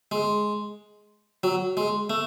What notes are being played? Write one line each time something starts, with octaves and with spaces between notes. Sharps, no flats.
G#3
F#3
G#3
A3